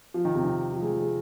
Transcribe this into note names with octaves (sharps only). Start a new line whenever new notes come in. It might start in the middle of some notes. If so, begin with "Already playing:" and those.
F3
D#3
C3
D#3
F3
G#3
F3
G#3